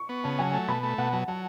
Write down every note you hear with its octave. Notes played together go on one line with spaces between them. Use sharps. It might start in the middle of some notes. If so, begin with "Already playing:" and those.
Already playing: C#6
B3
C#3 A5
F#3 G#5
A3 A5
B2 B5
A3
B2 F#5
F#3 A5
F#3 A5